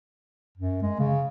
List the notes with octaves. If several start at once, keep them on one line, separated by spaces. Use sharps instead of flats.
F#2
G#3
C#3